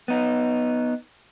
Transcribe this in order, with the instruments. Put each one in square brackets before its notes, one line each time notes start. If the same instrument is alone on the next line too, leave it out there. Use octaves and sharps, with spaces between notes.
[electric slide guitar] B3 D#4